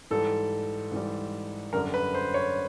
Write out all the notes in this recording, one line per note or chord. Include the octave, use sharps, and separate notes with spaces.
G#2 E3 G3 A4
G#2 E3 G3
F#2 D3 G3 A#4
B4
C5
C#5